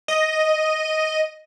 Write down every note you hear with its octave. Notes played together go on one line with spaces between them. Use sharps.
D#5